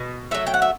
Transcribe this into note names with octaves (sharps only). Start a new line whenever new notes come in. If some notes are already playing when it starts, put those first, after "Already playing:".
Already playing: B2
F#3 A3 E5
G5
F#5
E5